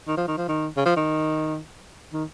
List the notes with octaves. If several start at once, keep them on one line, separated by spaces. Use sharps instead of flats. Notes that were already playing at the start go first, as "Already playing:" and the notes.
D#3
F3
D#3
F3
D#3
C#3
F3
D#3
D#3